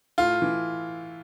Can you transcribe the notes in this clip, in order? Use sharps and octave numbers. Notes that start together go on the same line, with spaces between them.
A2 F4
E3